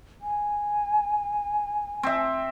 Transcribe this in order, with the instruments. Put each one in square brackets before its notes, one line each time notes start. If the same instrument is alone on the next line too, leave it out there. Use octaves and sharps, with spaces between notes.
[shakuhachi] G#5
[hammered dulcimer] C4 E5